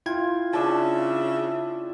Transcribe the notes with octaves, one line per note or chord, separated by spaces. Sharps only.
E4 F4 G5 G#6
C#3 D4 E5 A5